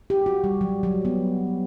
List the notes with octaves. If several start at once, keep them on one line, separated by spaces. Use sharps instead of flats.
G4
F#4
G3
F#3
F#3
B3